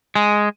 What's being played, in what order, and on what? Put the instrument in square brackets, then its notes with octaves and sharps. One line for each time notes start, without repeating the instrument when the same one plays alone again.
[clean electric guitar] G#3